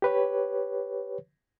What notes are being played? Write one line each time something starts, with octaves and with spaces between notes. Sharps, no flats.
G4 B4 C#5